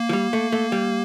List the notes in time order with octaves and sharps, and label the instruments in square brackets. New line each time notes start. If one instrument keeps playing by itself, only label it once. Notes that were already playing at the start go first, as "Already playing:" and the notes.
Already playing: [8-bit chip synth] A#3
[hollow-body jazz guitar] F3
G3
A3
A3
G3